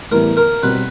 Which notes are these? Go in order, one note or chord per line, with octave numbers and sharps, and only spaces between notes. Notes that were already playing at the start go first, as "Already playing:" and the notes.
A2 E3 G3 B3 A#4
A#4
B2 G3 C4 B4